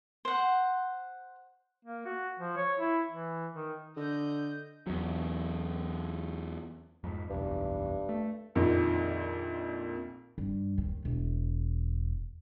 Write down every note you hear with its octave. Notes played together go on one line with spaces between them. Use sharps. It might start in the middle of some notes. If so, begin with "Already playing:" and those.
C5 F#5
A#3
F#4
F3
C#5
E4
E3
D#3
D3 D#5 G6
E2 F#3
F2 G#2
F#1 B1 E2 G2
A3
A#1 F2 A#2 D#3 F3
G2
D#2
E1